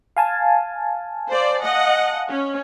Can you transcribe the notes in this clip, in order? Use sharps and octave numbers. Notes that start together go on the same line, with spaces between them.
F5 G#5 A5
C5 D5
D#5 F#5
C#4